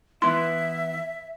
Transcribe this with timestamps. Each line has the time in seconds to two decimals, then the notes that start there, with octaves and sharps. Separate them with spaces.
0.22 E3 B3 E4 E5 C6